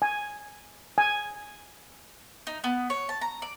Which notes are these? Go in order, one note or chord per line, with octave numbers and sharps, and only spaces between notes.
G#5
G#5
D#4
B3
C#5
A5
A#5
D5